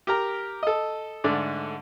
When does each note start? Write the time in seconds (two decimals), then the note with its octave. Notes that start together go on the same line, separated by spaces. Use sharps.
0.07 G4 A#4 A#5
0.63 A4 D#5
1.24 G#2 D3 A3 D5